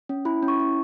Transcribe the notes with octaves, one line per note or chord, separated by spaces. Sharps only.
C#4
E4 B5
C#4
C#6
E4